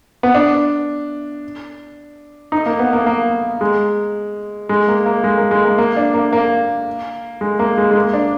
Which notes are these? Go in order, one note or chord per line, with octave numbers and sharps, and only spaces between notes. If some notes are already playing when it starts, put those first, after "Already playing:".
B3
D4
D#4
A#3
B3
A#3
A#3
G#3
G#3
A#3
A#3
G#3
A#3
G#3
A#3
A#3
D4
A#3
A#3
G#3
A#3
G#3
G#3
A#3
D4